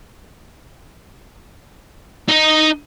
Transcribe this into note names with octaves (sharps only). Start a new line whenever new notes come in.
D#4 D#5